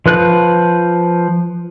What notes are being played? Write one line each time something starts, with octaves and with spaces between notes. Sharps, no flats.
F3 B4 F#6